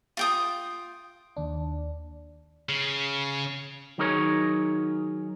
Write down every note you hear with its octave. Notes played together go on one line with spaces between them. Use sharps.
F4 G5 D#6
D#2 D4
C#3
D#3 F#3 D#4 G#4 A#4 C#5